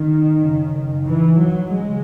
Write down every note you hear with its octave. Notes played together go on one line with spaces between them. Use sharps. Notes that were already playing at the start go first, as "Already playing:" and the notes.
Already playing: D#3
F#2 C#3
E3
F#3
C#3 G#3